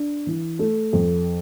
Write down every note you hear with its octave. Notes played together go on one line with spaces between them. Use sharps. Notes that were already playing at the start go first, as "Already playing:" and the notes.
Already playing: D4
E3
A3
F2